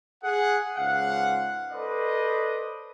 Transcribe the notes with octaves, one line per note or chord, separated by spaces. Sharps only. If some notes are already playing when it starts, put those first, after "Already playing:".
G#4 F#5
C#2 G#2 F5 F#5
A4 B4 C5 D5 D#5